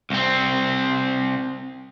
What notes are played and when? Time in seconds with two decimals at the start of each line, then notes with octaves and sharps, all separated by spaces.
0.10 C2 C4